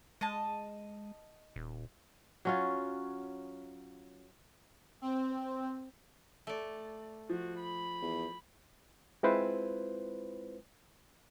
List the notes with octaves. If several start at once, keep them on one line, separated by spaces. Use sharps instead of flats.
G#3 D#5 A5
D#1
F#3 C#4 F4
C4
A3 D5
F3 F#4
B5
E2
G#3 C4 E4 F4 B4 C5